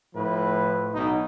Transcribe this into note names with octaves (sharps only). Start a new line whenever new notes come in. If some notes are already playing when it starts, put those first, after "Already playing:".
A2 F3 B4
B1 B2 D#4